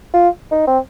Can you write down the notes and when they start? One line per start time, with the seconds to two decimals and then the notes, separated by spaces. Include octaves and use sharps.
0.14 F4
0.51 D#4
0.67 C4